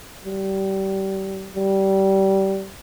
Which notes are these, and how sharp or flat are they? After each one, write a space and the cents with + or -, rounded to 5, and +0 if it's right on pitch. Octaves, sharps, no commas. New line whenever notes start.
G3 -25
G3 -20